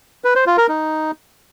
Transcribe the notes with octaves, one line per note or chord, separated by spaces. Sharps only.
B4
C5
F4
A#4
D#4